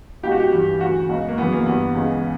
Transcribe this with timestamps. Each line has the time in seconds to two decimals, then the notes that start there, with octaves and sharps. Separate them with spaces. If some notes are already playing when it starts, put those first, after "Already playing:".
0.23 C#2 B2 G4
0.31 F#4
0.40 G4
0.52 G2 E3
0.80 D2 C#3 E3 F#4
1.09 C#2 B2
1.28 A#3
1.38 F#2 C#3 E3 B3
1.52 A#3
1.66 G2 E3 B3
1.95 C#2 C#3 E3